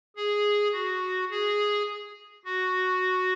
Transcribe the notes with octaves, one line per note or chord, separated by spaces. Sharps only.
G#4
F#4
G#4
F#4